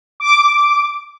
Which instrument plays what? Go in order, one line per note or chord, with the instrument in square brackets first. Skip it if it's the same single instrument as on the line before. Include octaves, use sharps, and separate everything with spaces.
[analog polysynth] D6